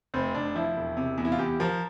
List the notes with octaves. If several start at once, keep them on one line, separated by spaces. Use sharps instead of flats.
F1 C4
F1 D4
F3 E4
E1
C3
E2
E4
F4
E2 G4
F3 A#4